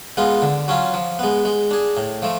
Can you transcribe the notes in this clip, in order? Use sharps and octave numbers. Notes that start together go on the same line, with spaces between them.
G#3 B3 F4
D3
F#3 C#4 F4
F3
G#3 B3
G#3
D4 G#4
A2
F3 A3